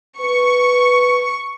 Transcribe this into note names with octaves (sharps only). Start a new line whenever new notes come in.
B4 C#6